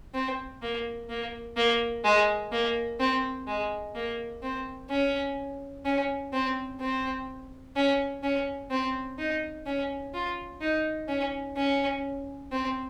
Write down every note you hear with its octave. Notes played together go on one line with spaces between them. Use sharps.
C4
A#3
A#3
A#3
G#3
A#3
C4
G#3
A#3
C4
C#4
C#4
C4
C4
C#4
C#4
C4
D#4
C#4
F4
D#4
C#4
C#4
C4